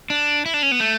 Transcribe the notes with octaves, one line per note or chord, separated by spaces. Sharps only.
D4
E4
D4
C#4
B3
A3